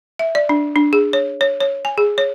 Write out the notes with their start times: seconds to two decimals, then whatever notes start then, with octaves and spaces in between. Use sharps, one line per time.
0.19 E5
0.35 D5
0.49 D4
0.76 D4
0.93 G#4
1.13 C#5
1.41 C#5
1.61 C#5
1.85 G#5
1.98 G#4
2.18 C#5